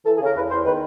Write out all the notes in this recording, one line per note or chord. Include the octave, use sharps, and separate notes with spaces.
E3 A4
G#4
C#3
A#4
E2 B4
E2 C5
D#3 B4